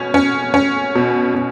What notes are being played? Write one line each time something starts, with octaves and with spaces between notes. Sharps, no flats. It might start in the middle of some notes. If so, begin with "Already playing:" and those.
Already playing: B2 C#4
C#4
C#4
B2
B2